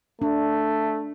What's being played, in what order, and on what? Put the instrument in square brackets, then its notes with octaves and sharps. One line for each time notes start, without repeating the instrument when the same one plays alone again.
[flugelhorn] A3 [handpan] D4